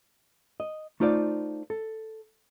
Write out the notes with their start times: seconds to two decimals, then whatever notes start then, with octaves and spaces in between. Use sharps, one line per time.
0.60 D#5
1.00 A3 D#4 F4 C5 D5
1.70 A4